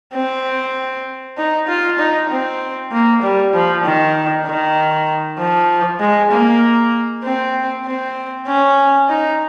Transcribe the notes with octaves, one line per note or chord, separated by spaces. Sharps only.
C4
D#4
F4
D#4
C4
A#3
G3
F3
D#3
D#3
F3
G#3
A#3
C4
C4
C#4
D#4